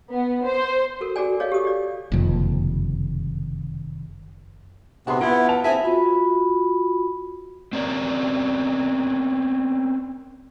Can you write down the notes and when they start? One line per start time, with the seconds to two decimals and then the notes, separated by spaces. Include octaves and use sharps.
0.11 B3
0.46 C5
1.01 F#4 A4 A#4
1.16 F#4 G#4 A4 D5 G#5
1.40 G#4 C#5 D#5 F5
1.52 G4 A4 D#6
1.65 G4 D5
2.12 F#1 F2 C3 D#3 G3
5.07 C3 B3 D4 F#4 G#4 B5 C6
5.21 B3 E4 F4 D7
5.49 A5 F7
5.64 C4 E4 G#4 E5 G#5
5.84 F4 F#4 B5
7.73 C4 C#4 A#4 D5